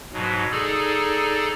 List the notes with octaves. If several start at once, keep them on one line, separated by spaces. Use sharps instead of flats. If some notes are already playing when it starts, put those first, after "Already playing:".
G#2 B2 F#3
D#4 G#4 A4 D5